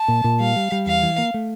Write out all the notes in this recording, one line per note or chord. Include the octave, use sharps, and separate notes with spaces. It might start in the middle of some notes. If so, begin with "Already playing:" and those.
Already playing: A5
A#2
A#2
G3 F5
G3
G3
E2 F5
E3
A#3
A3